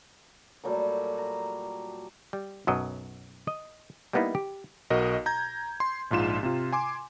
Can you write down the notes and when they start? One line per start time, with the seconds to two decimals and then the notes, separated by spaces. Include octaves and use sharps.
0.64 A#2 F#3 G3 A3
1.18 A#5
2.33 G3
2.67 B1 F#2 F#3 D#5
3.47 D#5
4.13 G3 A#3 B3 D#4 E4
4.35 G4
4.90 B1 F#4 A#4 D#5
5.26 A#5 G6 G#6
5.80 C6
6.11 A#1 G#2 F4 E7
6.43 C3 F4
6.72 G#5 C6 D6